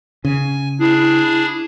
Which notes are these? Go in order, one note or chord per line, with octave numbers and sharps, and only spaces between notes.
C#3 G#5
D4 E4 G#4